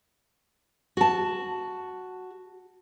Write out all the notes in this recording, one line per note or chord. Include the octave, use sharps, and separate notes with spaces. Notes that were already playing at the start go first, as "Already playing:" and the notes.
F#4 A5